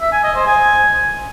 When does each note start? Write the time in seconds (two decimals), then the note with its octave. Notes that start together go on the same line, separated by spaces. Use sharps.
0.01 E5
0.12 G#5
0.24 D#5
0.35 C5
0.47 G#5